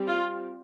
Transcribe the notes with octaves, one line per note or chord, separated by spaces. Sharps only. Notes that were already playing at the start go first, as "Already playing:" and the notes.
Already playing: G3 C4
F4